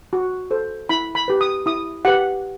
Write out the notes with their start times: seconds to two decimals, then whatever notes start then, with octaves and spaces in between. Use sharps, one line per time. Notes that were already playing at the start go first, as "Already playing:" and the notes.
0.13 F#4
0.51 A4 C5
0.89 E4 B5
1.15 B5
1.28 G4 B4
1.41 D#6
1.66 E4 D#6
2.05 G4 B4 F#5